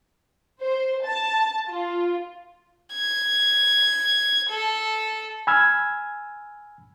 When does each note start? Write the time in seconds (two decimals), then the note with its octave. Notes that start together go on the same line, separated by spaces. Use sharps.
0.62 C5
1.05 A5
1.70 F4
2.94 G#6
4.49 A4
5.47 G#5 B5 E6 F6 G#6